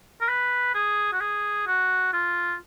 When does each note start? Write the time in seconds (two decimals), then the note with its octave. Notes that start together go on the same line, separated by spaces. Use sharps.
0.21 A#4
0.29 B4
0.75 G#4
1.13 F#4
1.21 G#4
1.67 F#4
2.13 F4